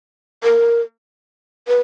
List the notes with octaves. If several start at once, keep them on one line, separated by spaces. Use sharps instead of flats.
A#4
B4